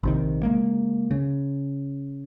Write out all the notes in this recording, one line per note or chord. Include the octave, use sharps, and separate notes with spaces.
A#1 C3 D#3
C#2 G#3 A#3
C#3